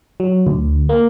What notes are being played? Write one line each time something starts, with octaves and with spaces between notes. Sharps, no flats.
F#3
D2
A#3